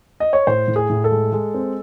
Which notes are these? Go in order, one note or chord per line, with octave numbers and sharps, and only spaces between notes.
D#5
C#5
A2 C5
A2
G#4
A2
A4
G#3
G#3
C4